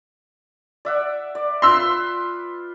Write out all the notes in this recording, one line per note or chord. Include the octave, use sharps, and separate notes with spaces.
D5 E5 F#5
D5
F4 B4 B5 C6 E6